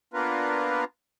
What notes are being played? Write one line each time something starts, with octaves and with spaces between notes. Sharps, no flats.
A#3 B3 D4 F4 A#4 B4